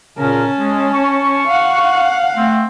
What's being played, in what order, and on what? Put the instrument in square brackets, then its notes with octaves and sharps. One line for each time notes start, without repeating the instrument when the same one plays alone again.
[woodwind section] A#2 C#3 A#4 [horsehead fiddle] C#4 A5
[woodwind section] G#3
C#6
[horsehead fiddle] F5 F#5
[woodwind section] A3 C4